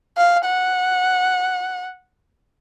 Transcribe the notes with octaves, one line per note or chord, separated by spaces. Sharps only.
F5
F#5